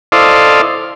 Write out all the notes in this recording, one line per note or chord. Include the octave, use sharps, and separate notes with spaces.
E4 A4 C5 D5 D#5 F5